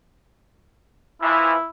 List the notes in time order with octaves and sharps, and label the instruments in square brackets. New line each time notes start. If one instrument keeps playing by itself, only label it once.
[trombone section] E3 F3 [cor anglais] E4